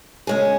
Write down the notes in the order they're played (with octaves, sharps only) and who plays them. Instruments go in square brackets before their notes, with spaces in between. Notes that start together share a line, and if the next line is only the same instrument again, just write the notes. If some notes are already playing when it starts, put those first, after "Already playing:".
[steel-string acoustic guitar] C#3 G#3 C#4 G#4